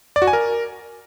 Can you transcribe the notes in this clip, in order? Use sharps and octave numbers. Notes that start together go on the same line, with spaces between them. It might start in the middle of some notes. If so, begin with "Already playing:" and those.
D5
F#4
G#5
A#4